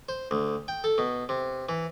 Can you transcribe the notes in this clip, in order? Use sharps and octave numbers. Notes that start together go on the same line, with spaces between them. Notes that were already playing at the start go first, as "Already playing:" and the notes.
C5
D2
G5
A4
B2
C3
E3